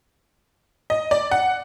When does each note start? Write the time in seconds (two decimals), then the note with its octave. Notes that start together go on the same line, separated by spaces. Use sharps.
0.90 D#5
1.11 D5
1.31 F#5